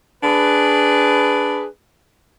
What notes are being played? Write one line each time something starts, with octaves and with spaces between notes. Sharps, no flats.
D4 G#4 B4